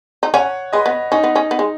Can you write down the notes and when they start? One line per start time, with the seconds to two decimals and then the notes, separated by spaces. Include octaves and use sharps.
0.23 D#4
0.34 C#4 C#5 F#5
0.73 G#3 B4 D#5
0.86 B3
1.12 C#4 D#4
1.23 B3
1.36 C#4
1.51 B3
1.59 G#3